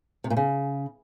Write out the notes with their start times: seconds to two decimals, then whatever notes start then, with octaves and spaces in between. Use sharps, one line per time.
0.24 C3
0.30 A#2
0.37 C#3